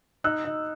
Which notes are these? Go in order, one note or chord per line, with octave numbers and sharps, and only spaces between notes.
D#4 E6 F#6
D#4